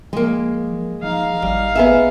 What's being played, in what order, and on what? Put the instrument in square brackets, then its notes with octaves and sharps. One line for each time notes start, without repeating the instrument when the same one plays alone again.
[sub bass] F3 [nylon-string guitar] G#3 A#3
[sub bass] F3 [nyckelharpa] D#4 F5
[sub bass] G#1 [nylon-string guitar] G3
[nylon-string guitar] B3 G#4 E5